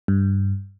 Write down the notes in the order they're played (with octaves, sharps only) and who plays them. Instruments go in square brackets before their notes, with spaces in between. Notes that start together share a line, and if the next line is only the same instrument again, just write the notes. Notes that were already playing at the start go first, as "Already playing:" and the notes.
[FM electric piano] G2